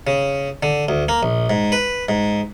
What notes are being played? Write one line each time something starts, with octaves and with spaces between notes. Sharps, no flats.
C#3
D3
D2
A#3
A#1
G#2
B4
G#2